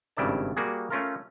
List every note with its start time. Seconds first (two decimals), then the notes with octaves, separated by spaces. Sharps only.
0.17 G#1 G2 C#3 E4 D5 A5
0.57 G3 A#3 F#4 G#4
0.90 A3 C#4 F4 A#4